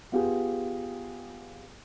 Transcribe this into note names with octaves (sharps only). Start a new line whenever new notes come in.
B3 F4 G4 G#4